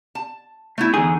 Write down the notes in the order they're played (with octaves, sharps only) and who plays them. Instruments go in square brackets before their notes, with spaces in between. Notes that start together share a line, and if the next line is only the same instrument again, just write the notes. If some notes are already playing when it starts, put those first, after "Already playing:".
[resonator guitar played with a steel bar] A5
A3 B3 E4
[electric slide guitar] E2 D3 G#4 [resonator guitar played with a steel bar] D#4